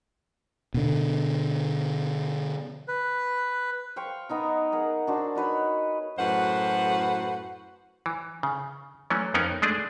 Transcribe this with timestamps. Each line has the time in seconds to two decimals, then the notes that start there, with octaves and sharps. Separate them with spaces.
0.74 B2 D3
2.88 B4
3.96 C5 F5 G5 C#6
4.29 B3 D#4 A#5
4.72 G#4 A#4 F#5
5.07 D4 F#4 C5
5.35 D#4 F#4 B4 C#5
6.18 F#2 A2 F#4 B4 C5 F#5
8.06 E3
8.43 C#3
9.10 E3 F#3 A3 C#4
9.34 F2 B3 C#4 D#4 A#4
9.62 G#3 A3 D4 G#4